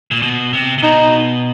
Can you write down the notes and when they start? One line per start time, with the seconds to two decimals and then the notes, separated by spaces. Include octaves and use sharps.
0.11 A#2
0.22 B2
0.53 C3
0.78 C3
0.83 B2 D#4